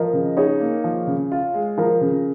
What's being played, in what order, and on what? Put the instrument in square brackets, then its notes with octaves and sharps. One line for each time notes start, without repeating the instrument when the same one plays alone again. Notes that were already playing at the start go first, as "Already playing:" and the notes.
Already playing: [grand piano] F3 [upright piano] A#4 D#5
[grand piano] C#3
[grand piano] D#4 [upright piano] G#4 C#5
[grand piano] A#3
F3
C#3
F4
G#3
[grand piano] F3 [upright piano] F4 A#4
[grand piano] C#3